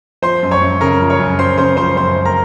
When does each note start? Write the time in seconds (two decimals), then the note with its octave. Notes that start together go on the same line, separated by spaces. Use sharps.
0.22 F3 C5 C6
0.43 F#2
0.51 C#5 C#6
0.61 F#2
0.81 C#3 A#4 A#5
1.01 F3
1.10 C#5 C#6
1.19 F#2
1.38 F#2 C5 C6
1.58 C#3 C5 C6
1.77 F3 C5 C6
1.97 F#2 C5 C6
2.16 F#2
2.25 A#4 A#5